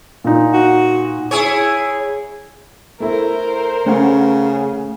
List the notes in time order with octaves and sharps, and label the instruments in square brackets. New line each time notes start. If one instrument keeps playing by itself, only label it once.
[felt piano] A#2 D#4
[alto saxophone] F#4
[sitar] E4 G#4 C#5
[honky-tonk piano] A3 E4 [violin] A#4 C5
[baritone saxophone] C#3 [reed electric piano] A3 [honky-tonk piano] C#4 F#5